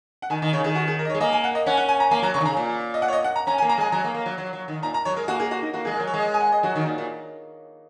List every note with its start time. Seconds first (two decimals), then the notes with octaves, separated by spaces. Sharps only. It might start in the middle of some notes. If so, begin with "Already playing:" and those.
0.22 F#5
0.30 D#3 G#5
0.42 D#3 D#5
0.53 C#3 C#5
0.64 D#3 G#4
0.75 F#4
0.88 G#4
0.99 A#4
1.05 D#5
1.10 C#5
1.15 G#3
1.20 A#3 D#5
1.33 G#5
1.44 F#5
1.55 D#5
1.66 C#4 F#5
1.77 F#5
1.88 G#5
2.00 A#5
2.11 A#3 G#5
2.22 F#3 A#5
2.34 C#3 C#6
2.41 D#3
2.45 C#3 A#5
2.57 A#2
2.94 D#5
3.02 F#5
3.08 C#5
3.13 D#5
3.24 F#5
3.36 A#5
3.47 C#4 A#5
3.58 G#5
3.62 A#3
3.69 A#5
3.78 G#3 G#5
3.92 F#3 A#5
4.04 A#3
4.14 A#3
4.26 F#3
4.38 F#3
4.53 F#3
4.68 D#3
4.83 A#2 A#5
4.94 A#5
5.05 F#3 C#5
5.16 G#3 A#4
5.28 A#3 F#4
5.40 G#4
5.51 F#4
5.62 D#4
5.73 A#3 F#4
5.85 G#3 G#4
5.96 A#4
6.00 F#3
6.07 C#5
6.14 G#3 D#5
6.34 G#5
6.41 F#5
6.52 D#5
6.63 F#3 F#4
6.76 D#3
6.86 A#2
6.98 A#2